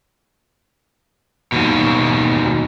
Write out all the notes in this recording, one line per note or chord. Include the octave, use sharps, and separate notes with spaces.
D#2 B2